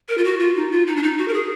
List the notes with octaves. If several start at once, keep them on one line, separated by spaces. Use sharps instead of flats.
A#4
F4
F#4
F4
D#4
F4
D#4
D4
D#4
F#4
A#4
G#4